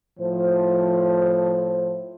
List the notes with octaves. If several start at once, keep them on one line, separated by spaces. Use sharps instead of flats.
A2 F3 C5